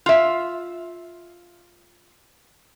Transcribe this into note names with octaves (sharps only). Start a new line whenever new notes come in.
F4 E5